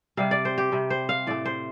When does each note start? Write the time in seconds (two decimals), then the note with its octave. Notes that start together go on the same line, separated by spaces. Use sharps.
0.17 C3 G3 F5
0.31 D5
0.45 C5
0.58 G4
0.72 C3 G3
0.90 C5
1.09 F5
1.27 A2 A3 D5
1.45 C5